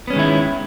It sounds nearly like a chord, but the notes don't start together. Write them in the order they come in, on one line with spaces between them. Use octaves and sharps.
B3 C#4 G#3 D#3 E4